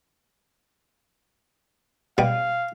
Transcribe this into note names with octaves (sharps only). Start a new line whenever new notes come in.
B2 G3 F5